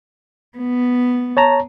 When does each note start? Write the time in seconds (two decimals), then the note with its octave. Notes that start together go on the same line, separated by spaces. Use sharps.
0.58 B3
1.37 C#5 A5 A#5